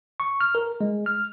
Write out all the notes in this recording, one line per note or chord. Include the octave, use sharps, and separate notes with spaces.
C#6
F6
A#4
G#3
F6